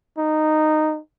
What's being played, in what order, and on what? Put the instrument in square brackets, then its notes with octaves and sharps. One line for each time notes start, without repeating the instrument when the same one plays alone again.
[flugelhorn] D#4